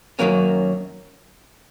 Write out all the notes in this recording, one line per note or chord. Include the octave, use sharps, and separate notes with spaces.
F#2 D#3 F#3 A#3 C#4